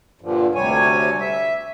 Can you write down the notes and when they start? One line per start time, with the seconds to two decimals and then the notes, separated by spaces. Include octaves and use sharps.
0.21 G2 A#2 D3 F3
0.55 D2 C3 G3 C#5 G#5
1.21 E5